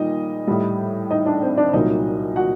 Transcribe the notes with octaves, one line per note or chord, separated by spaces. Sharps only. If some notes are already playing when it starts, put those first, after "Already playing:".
Already playing: A#2 G3 D#4 D#5
A2 G3
D#4 D#5
D4 D5
C4 C5
D4 D5
C2 A#2 F#3 D#4 D#5
F#4 F#5